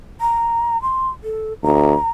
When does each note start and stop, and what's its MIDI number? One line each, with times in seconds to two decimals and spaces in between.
0.21 0.81 82
0.82 1.09 84
1.24 1.53 69
1.63 1.94 38
1.63 2.11 82